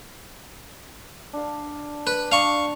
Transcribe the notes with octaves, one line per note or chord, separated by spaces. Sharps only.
D4 F5
B4
D4 F5 C#6